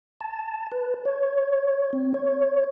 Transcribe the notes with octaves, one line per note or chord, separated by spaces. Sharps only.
A5
B4
C#5
C4
C#5